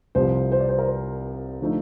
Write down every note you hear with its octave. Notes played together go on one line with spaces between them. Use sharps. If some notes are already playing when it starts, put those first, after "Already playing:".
C2 C3 F3 C5
C5
D5
C5
A#4
C5
D3 F3 A3 D#4